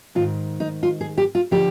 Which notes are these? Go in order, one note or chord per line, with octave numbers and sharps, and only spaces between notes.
G#2 D#3 F4
D#4
F4
G#4
G4
F4
D3 F3 G4